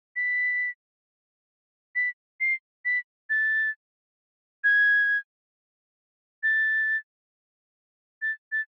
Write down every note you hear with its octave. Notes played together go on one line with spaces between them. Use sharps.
B6
B6
C7
B6
A6
G#6
A6
A6
A6